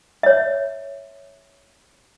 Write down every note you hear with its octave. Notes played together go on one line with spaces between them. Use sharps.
C#5 E5